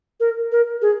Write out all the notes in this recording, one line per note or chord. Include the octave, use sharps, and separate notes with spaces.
A#4
A#4
G#4